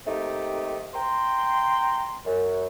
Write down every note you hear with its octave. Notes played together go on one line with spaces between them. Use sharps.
A3 A#3 C4 D#4 G4
G5 A#5 C6
F#2